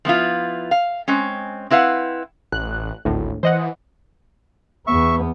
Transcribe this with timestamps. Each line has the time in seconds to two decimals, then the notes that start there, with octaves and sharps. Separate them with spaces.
0.05 F3 B3 E4 F4
0.71 F5
1.08 G#3 C4 C#4
1.70 C4 E4 B4 F5 F#5
2.52 A1 F#6
3.05 G#1 D2 A2
3.43 E3 C5 D#5 F#5
4.87 E2 B3 E5 C#6